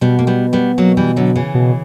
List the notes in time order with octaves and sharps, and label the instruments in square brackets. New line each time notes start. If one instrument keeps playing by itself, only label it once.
[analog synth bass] B2 [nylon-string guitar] G3 B3
[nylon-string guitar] A#3
G3 B3
G3 B3
F#3 A#3
E3 G3
D3 F#3
C#3 E3
[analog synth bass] B2